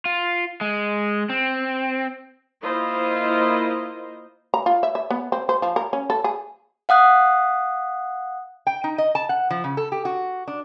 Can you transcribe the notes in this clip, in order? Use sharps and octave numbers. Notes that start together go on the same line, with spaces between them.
F4
G#3
C4
A#3 E4 F4 C5 D#5
A#5
F4
E5
E5
B3
C4
C5
F3
A#4
C#4
A4
G#4
F5 F#5 D#6 F#6
G5
D#4
D#5
A5
F#5
F3
C#3
A4
G4
F#4
D4